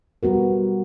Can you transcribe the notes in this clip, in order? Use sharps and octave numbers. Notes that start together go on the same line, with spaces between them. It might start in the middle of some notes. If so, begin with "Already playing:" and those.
G3 B3 F#4 A#4